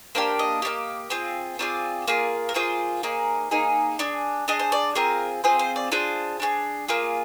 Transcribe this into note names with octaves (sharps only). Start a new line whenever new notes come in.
A#3 D4 G4 C5
D#5
A#3 D4 G4
C4 F4 G#4
C4 F4 G#4 D5
A#3 F4 G#4
A#4
A#3 F4 G#4 C5
A#3 D#4 G#4
A#3 D#4 G#4
D4 G#4
D4 G#4 D#5
C5
D5
C4 F4 G#4 A#4
C4 F4 G#4 C5
C5
D5
D4 F4 G#4 C5
D4 F4 G#4
A#3 F4 G#4